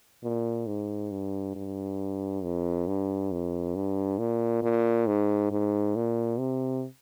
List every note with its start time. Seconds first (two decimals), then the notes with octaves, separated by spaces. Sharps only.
0.24 A#2
0.67 G#2
1.11 G2
1.55 G2
2.43 F2
2.88 G2
3.32 F2
3.75 G2
4.19 A#2
4.63 A#2
5.07 G#2
5.51 G#2
5.96 A#2
6.39 C3